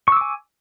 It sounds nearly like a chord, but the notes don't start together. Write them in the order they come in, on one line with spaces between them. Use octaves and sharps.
C#6 E6 D6 G#5